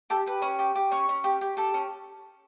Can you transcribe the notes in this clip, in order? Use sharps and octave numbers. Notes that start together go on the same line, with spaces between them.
G4 A4
G4 B4
C#4
G4
G4
C#4 C#5
C#4
G4
G4
G4 A4
C#4